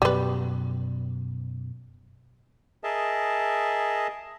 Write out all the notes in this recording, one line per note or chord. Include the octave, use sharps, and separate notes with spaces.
F#2 B2 G3 B4
G#4 A#4 D#5 E5 A5